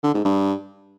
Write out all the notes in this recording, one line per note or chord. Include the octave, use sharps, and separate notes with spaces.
D3
G#2
G2